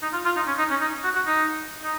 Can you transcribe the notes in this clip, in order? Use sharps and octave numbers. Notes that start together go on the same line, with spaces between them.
D#4
F4
F4
D#4
C#4
D#4
C#4
D#4
F#4
F#4
D#4
D#4